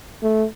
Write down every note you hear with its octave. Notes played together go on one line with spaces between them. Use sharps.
A3